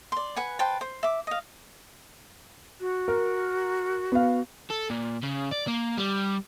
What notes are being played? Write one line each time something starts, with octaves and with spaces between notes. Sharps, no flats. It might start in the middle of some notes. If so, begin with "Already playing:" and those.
D5 C6
B4 F#5 G#5
B4 C5 G5 A5
C5
E5 D6
D#5 F5
F#4
A#4
B3 F5
A4
A#2
C#3
D5
A#3
G3